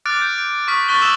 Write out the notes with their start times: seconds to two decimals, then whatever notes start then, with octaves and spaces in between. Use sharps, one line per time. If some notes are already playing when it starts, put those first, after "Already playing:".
0.05 D6 F6 F#6 A6 D7
0.22 G6
0.38 D7
0.68 C#6 D#6 F6 B6 D7
0.88 C#6 F#6 A6 B6 G7
1.01 C#6 D#6 E6 E7 F#7